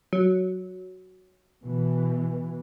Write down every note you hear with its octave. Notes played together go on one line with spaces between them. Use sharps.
F#3
B2 E3